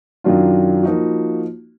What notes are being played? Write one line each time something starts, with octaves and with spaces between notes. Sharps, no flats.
F#2 D#3 F#3 D4 F4
F3 A#3 D#4 F#4